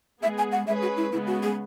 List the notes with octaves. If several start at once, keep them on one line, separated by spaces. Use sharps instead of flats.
G#3 B3 G#4 E5
G#5
F#5
G#3 C#4 G#4 B4 E5
F#4
E4
C#3 G#3 B3 E4
F#4
G#4